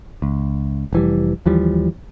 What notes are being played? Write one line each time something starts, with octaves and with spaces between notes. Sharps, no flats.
C#2
F1 E3 G3
D#2 E3 F3 G3